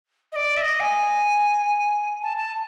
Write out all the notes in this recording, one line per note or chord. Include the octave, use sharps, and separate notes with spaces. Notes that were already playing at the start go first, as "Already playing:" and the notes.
D#5
D5
E5
D#5
G#5
A5
A5